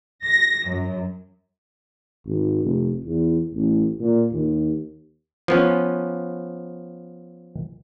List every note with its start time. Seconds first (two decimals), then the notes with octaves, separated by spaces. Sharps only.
0.24 A#6
0.68 F#2
2.26 G#1
2.62 F1
3.05 E2
3.54 A1
4.00 A#2
4.32 D#2
5.48 F3 B3 C#4